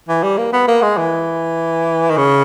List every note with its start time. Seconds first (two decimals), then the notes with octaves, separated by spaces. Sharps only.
0.09 E3
0.24 G3
0.38 A#3
0.53 B3
0.68 A#3
0.83 G#3
0.98 E3
2.10 D#3
2.17 C#3